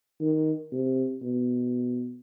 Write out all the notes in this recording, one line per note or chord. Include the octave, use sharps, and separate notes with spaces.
D#3
C3
B2